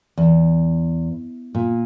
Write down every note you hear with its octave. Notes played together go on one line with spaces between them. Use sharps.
E2
A#2